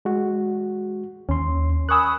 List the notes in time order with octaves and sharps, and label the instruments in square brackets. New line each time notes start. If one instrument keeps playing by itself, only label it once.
[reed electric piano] G#3 F#4
[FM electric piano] D#2 [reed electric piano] C#4 C6
[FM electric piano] A#4 C#6 E6 [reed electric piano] G#5 F#6 [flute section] B5 D#6